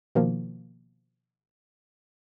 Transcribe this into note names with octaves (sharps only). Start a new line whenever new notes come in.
B2 D#3 F3 A#3